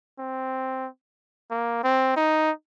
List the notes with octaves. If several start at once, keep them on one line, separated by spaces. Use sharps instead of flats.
C4
A#3
C4
D#4